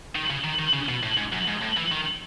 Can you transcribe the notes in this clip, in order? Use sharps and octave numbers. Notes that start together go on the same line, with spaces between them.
D#3
C#3
D#3
D#3
C#3
B2
A2
G#2
F#2
G#2
A2
E3
D#3